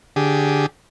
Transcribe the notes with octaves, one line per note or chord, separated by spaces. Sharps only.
D3 G4 G#4